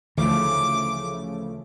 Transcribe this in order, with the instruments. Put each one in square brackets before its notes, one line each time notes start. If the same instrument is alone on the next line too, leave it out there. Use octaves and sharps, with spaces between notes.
[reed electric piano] D2 [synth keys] C#3 F3 A3 [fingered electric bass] E3 [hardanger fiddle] D6